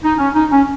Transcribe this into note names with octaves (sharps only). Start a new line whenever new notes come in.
D#4
C#4
D#4
C#4